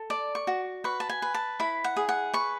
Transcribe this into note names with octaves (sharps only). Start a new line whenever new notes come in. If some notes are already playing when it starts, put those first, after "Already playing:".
Already playing: A4
D5 A5
C#6
F#4
B4 C#6
A5
G#5
B4
A5
E4 B5
F#5
G#4
F#5
B4 C#6